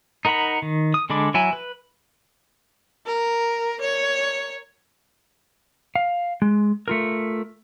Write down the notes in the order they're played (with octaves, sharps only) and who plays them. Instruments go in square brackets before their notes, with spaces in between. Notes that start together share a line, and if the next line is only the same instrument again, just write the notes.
[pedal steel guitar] D#4 A#4 F#5 A#5 B5
D#3
D#6
D3 G#3 D4 B5 D6
F#3 E4 G#5
B4
[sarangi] A#4
C#5
[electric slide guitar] F5
G#3
A3 F4 A#4